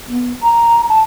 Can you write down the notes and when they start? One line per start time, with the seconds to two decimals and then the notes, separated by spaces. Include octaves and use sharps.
0.08 B3
0.43 A#5
0.89 A5